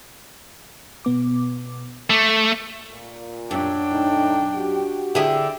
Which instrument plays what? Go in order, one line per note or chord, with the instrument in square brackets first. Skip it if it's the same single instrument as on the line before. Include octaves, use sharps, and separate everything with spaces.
[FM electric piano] B2 B3 D6
[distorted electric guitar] A3 [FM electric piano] D6
[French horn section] A#2
[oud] F#2 [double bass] D4 [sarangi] G5
[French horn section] A2 A3 D#4
F#4 G4
[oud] D3 E4 G#4 [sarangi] G5